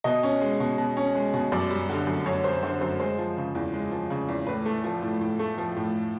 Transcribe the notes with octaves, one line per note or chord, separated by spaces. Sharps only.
B2 D#5
C#4
G#3
B2
B2
C#4
G#3
B2
F#2 D5
G3
D3
F#2
F#2 C#5
G3 C5
D3 C5
F#2 C5
G#3 C5
F3
C#3
E2
G#3
F3
C#3
E2
A2 B4
A3
F3
A2
A2
A3
F3
A2